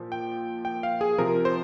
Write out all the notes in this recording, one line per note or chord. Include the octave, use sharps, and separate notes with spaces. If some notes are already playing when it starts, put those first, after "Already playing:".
Already playing: A#2 F3
G5
G5
F5
G#4
C3 F3 A#4
C5